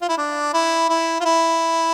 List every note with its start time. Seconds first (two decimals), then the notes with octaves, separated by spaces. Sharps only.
0.01 F4
0.09 E4
0.18 D4
0.53 E4
0.89 E4
1.21 F4
1.25 E4